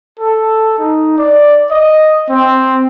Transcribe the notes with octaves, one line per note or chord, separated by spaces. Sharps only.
A4
D#4
D5
D#5
C4